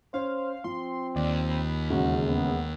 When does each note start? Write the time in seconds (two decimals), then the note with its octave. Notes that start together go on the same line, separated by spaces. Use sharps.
0.14 C#4 C5 F5
0.64 F3 C4 C6
1.16 D#2 D5
1.50 B5
1.90 E1 C#3 F#4
2.29 B3